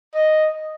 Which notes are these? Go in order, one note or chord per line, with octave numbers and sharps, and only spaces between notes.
D#5